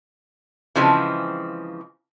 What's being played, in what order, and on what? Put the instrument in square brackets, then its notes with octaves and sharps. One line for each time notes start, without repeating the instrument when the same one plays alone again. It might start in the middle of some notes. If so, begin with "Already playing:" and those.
[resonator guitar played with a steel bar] C#3 E3 F3 G#3 C4